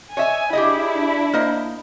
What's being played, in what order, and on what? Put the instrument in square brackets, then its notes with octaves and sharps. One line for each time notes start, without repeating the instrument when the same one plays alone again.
[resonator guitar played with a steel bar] C#5 D#5 E5 [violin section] G#5
[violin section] D4 E4 [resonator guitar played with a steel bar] G4 G#4 D#5
[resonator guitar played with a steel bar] A#3 C5 D#5